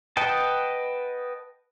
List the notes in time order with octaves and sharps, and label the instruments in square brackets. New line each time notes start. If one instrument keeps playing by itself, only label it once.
[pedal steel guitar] B4 D#5 F#5 G5 A5